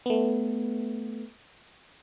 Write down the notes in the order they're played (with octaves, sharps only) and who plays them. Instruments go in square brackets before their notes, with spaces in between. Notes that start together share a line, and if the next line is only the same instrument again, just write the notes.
[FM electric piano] A3 B3